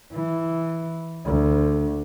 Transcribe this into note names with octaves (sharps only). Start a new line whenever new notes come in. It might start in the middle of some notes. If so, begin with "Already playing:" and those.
E3
D2